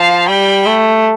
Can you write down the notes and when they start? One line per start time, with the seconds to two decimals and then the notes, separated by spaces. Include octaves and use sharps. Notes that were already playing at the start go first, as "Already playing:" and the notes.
Already playing: F3 F5 A5
0.28 G3 G5 B5
0.66 A3